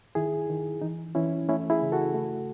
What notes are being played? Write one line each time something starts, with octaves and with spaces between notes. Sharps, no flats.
D#3 E4 G#4
D#3
E3 D#4
E3 C#4 E4
A3 C#4 E4
E4 G#4
C#3
F#4 A4
A3